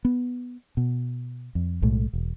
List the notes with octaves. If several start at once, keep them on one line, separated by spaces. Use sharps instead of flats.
B3
B2
F2
B1 A2 G#3 A3
E1